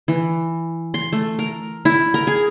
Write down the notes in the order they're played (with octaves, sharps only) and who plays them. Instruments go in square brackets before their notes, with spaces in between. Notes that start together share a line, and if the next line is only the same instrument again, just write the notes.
[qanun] E3
C6
A3
A#4
E4
A#4
G#4